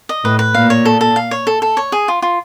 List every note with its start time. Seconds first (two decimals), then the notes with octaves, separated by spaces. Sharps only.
0.09 D#5
0.24 A2 B4
0.39 B4
0.55 A#2 F5
0.70 C#5
0.85 A4
1.01 A4
1.16 F5
1.31 C#5
1.47 A4
1.62 A4
1.77 C#5
1.92 G#4
2.08 F4
2.22 F4